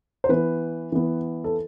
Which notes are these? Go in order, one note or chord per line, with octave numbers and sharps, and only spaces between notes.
C5
E3 B3 B4
E3 B3
A4